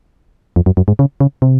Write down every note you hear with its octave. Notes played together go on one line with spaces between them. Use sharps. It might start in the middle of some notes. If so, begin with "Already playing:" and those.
F2
F#2
F#2
G#2
C#3
C#3
C3